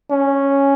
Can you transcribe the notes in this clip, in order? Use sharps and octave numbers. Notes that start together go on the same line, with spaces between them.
C#4